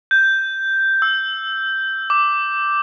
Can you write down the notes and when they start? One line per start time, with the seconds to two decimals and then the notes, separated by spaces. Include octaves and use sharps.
0.11 G6
1.02 E6
2.10 D6